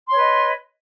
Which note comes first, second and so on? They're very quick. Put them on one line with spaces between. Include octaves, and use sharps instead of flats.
C6 C#5 B4 D#5